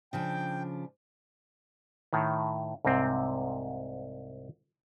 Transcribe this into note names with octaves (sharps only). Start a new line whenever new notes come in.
C#3 F3 D4 G5
A2 D#3
C2 G#2 C3 C4